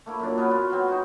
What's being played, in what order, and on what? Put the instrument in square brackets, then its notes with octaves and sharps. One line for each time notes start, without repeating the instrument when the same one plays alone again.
[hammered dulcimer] A3 A#3 E4
F#2 A#2 D4
B3 C#4 B4
B3 F4
F#3 C4
D#4 F#4